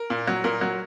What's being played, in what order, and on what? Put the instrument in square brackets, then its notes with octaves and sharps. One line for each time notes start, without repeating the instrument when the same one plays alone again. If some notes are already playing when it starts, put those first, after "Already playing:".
Already playing: [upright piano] A#4
A#2
F#3
A#2 A#4
F#3